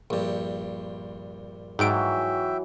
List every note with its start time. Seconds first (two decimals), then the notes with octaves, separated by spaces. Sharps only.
0.10 A#1 G2
1.79 G#2 E3 F#3 E5 G5 D7